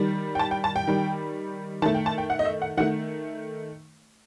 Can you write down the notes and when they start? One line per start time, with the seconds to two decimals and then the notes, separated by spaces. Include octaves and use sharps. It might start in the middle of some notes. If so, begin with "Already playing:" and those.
Already playing: D#3 G3
0.35 G5
0.39 A5
0.51 G5
0.64 A5
0.76 G5
0.87 D#3 G3
1.82 D#3 A5
1.86 A3
1.95 G5
2.06 A5
2.18 G5
2.30 F#5
2.39 D#5
2.45 E5
2.62 F#5
2.77 D#3 F#5
2.80 A3